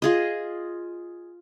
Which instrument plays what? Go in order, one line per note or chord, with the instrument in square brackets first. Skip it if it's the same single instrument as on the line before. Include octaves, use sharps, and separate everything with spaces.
[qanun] F4 G#4 D#5